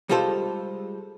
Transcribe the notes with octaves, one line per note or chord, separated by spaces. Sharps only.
G3 G#3 F4 A4 C5